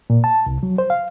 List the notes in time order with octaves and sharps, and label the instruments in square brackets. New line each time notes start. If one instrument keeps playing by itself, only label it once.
[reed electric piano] A#2
A5
C2
F#3
C5
F5